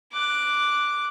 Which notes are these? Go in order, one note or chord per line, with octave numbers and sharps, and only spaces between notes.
D6 F#6